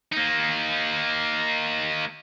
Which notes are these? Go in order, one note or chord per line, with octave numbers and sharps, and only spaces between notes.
A#3 D#4